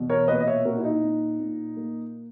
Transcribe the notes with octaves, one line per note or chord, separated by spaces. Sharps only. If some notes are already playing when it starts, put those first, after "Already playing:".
Already playing: E2 B2
A#4 C#5
A#2 B4 D#5
D#5
C#5 E5
A#2 F#4 A#4
E4
D#4
A#2
A#2
A#3